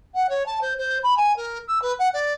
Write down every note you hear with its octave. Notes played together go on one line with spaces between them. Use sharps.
F#5
C#5
A5
C5
C5
B5
G#5
A#4
E6
B4
F#5
D5